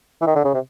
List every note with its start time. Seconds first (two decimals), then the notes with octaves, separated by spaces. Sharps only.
0.21 E3
0.27 D#3
0.36 D3
0.45 C#3
0.54 C3